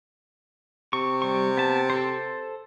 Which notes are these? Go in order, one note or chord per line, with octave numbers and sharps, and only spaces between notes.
C3 C#6
G3 C#6
B3 A5
A4 C5